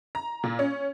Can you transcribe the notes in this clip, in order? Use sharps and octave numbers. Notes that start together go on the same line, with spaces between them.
A#5
A#2
C#4